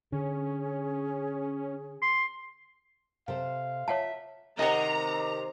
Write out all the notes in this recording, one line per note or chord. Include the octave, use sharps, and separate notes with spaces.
D3 C#4 G#4
C6
C3 A4 C5 F5
F4 C#5 E5 F#5 A5
C3 D#3 D#5 F#5 A#5